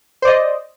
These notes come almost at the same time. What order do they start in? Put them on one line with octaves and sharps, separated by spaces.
C5 D5 D#5